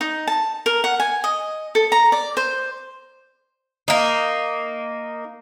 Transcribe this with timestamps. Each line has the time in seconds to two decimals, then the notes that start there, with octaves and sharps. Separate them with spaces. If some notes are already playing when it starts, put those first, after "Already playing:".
0.01 D#4
0.27 A5
0.66 A#4
0.84 F#5
1.00 G#5
1.24 D#5
1.75 A4
1.92 A#5
2.12 D5
2.37 C5
3.88 A#3 D#4